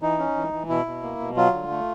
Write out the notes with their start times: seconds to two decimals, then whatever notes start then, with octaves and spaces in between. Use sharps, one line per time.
0.02 E3 D#4
0.19 C#4
0.36 E3
0.53 E3
0.69 B2 E4
0.86 B2
1.02 A#3
1.20 B2
1.36 F#3 F4
1.53 D3
1.71 A3